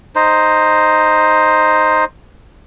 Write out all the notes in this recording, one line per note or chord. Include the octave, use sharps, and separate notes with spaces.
D#4 C5